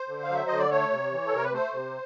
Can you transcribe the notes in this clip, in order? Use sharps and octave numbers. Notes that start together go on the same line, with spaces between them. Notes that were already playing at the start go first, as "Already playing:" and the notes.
Already playing: C5
D3
F5
F#3 E5
D3 D#5
D5
A3 C#5
C3
E3
A4
C3 A#4
B4
A3 C5
C3